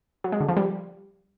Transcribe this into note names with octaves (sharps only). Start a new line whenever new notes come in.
F#3
G#3
D3
F3
G3